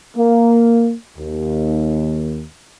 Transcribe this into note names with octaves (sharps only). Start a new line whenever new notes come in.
A#3
D#2